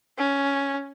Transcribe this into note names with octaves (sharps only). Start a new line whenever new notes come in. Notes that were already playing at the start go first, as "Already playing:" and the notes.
C#4